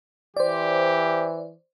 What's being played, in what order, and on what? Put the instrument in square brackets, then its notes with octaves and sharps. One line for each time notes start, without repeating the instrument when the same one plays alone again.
[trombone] E3 [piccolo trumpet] G4 [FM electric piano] C5 D5